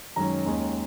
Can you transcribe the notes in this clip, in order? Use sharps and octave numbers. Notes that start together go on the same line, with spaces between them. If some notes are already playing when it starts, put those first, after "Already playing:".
F#2 D#3 G#3 C#4 A#5
D#2 D#3 G#3 C#4